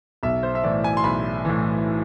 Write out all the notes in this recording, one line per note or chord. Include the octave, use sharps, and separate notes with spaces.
B1 E5
C5
E5
A2 E3 D5
G#5
C6
B1 B5
A2 E3